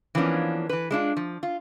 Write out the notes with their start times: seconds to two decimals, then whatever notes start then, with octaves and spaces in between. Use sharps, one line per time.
0.15 E3 F3 A#3 B3 C#4 D4
0.69 E3 B4
0.91 G#3 D4 E4 F4
1.17 F3
1.43 F4